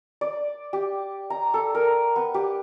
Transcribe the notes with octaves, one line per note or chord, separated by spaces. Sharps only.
D5
G4
A#5
A4
A#4
B3
G4